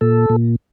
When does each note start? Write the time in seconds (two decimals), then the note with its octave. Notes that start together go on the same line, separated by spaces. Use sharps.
0.01 A#2 A4
0.30 A#2